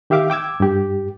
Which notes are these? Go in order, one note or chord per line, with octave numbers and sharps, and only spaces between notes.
D#3 G4 E5 F5 D6
G5 D6 E6 G#6
G2 G4